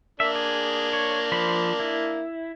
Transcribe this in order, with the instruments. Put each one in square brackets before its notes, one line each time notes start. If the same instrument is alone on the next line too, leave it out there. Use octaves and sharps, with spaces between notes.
[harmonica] A#3 D4 [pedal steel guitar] E5
[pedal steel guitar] G#4
C#5
F3 C5 B5
E4